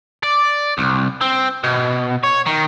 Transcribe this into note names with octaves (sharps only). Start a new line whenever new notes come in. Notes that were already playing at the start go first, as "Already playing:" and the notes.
D5
C2
C4
B2
C#5
D#3